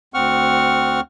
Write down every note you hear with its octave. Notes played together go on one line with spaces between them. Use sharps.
D2 C4 F#5 C#6 F6